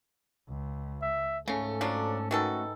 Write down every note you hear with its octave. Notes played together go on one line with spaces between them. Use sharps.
C#2
E5
G#2 C#3 A3 C#4 A4
F3 F#3 D4
D#3 E3 F#4 A4